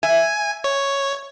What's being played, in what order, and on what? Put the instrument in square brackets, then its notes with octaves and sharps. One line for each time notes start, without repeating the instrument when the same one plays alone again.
[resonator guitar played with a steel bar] E5 [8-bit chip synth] G#5
[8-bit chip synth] C#5